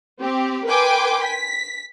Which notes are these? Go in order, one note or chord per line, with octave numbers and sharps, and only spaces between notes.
C4 G4
A#4 B4 G5 G#5 C6 D6
B6